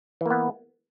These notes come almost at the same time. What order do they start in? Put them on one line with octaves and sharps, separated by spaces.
E3 A#3 B3